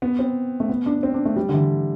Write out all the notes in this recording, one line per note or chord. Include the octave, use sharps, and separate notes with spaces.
B3
C4
A3
B3
D4
C4
D4
A3
G3
D3
E3